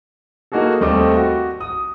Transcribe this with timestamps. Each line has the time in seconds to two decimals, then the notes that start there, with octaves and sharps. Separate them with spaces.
0.52 A#3 D#4 F#4 G#4 A4
0.80 D#2 G3 A3 C4 D#5 D6
1.16 F#4
1.61 D#6